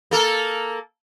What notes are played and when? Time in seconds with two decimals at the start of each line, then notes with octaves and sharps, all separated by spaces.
0.11 A#3 A4 A#4